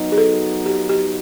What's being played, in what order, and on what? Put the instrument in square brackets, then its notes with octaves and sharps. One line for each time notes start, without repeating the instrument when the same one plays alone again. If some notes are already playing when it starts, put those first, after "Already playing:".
Already playing: [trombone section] F#3 B3 D#4 F#4
[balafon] G#4
A4
G4
G4